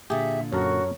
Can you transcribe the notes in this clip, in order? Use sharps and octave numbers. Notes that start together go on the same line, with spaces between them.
A#2 D3 G4 G#4 E5
F#2 F#4 A4 A#4 C#5